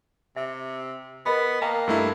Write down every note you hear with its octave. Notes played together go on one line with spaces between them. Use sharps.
C3 E5
B3 A#4 D#5 B5
A#3 D#5 G5 A5 A#5
G2 A3 E4 E6